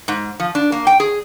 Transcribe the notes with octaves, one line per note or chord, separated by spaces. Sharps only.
G#2
F3
D4
A#3
G5
G#4